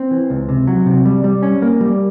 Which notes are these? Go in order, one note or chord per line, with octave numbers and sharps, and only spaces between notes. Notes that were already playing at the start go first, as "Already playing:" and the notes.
Already playing: C4
E3
C#2
C3
F#3
C3
G3
G3
C#4
A#3
G3